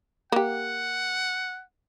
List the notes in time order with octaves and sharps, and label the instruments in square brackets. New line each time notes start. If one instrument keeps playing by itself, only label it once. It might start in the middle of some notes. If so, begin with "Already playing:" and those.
[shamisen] A#3 G4 [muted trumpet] F#5